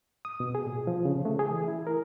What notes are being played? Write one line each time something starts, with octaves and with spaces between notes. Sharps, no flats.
D#6
B2
G#4
A#2
F3
C#3
A3
G#4
E3
E4
A#4